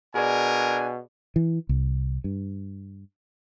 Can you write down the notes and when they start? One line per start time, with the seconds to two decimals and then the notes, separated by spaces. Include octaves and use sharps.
0.15 B2 D4 G#4 A#4 D5 G#5
1.36 E3
1.69 C2
2.24 G2